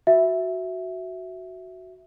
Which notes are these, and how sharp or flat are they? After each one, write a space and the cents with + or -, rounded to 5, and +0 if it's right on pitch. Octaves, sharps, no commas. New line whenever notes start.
F#4 +0 E5 +0